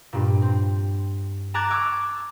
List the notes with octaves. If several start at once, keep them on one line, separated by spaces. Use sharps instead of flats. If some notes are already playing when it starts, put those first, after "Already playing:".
G2 A#2
C4
A5 A#5 D6 F#6 G#6 A6
C#6 D6 E6